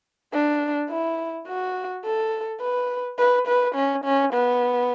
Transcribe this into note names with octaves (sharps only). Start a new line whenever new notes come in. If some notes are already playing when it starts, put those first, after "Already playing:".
D4
E4
F#4
A4
B4
B4
B4
C#4
C#4
B3